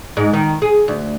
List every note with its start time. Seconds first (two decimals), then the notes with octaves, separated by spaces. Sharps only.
0.17 G#2
0.33 D#3
0.62 G#4
0.88 D2